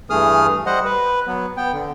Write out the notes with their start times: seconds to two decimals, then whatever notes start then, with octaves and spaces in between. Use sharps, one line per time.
0.10 G2 E3 A3 G#4 D#6 F6
0.66 G3 C5 D#5 F#5
0.85 B4
1.27 F#3 B3
1.57 B3 G5
1.73 D3